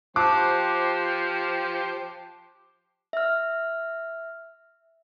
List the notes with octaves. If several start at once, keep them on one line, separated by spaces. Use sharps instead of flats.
F3 G4 C5 A5 D6 F#6
E5 F6